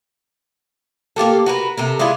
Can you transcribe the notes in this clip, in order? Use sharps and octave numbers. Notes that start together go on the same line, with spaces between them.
A#3 F4 G4 A4
F#4 A#4 B4
C3 A4 A#4
G#3 D4 E4 F4